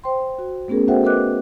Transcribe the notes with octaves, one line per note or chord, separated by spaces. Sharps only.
C5 G5 C6
F#4
A3 B3 C#4 G#4 A#4
F#4 A4 C5 E5 F#5 G5
A#4 B4 D#5 D6 F#6